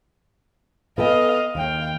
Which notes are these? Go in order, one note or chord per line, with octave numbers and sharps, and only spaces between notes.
B3 A4 D#5 F5 G5
D#2 F5 G5